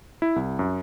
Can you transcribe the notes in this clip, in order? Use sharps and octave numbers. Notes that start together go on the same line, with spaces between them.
E4
C2
F#2